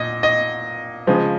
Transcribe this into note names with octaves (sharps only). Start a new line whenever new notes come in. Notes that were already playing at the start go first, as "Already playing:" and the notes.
Already playing: A#2 D#5
D#5
C#3 F3 G#3